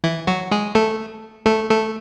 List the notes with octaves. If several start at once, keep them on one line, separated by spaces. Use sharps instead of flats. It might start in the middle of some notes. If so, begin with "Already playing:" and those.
E3 E4
F#3 F#4
G#3 G#4
A3 A4
A3 A4
A3 A4